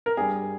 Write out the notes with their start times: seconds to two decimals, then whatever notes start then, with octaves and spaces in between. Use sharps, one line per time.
0.06 A#4
0.17 G2 G3 G#4